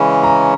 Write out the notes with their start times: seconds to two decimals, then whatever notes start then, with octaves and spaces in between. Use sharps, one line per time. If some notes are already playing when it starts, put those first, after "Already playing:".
Already playing: C#3 E3 G#3 C#4 B5
0.23 A#5